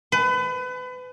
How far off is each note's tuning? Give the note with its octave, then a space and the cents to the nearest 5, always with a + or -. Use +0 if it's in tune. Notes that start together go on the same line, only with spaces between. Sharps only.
B4 +30